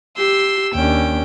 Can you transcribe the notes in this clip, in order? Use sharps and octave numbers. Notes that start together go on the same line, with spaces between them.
G4 C6 E6
D#2 C#4 D4 G5